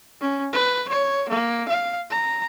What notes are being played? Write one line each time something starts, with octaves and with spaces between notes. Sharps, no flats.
C#4
B4
C#5
A#3
F5
A#5